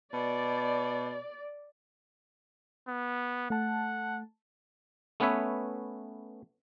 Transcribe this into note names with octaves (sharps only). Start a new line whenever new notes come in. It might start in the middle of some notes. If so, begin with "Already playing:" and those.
B2 D5
B3
A3 F#5 A5
A3 B3 C#4 B4 C#5 E5